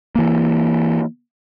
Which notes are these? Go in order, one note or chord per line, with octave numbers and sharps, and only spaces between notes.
E3 A#3